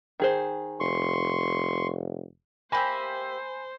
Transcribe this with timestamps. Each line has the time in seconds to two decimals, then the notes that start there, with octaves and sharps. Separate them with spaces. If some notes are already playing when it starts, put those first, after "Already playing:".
0.20 D#3 G#4 C5
0.80 F1 C6 C#6
2.72 A#3 G4 C5 E5 G#5 B5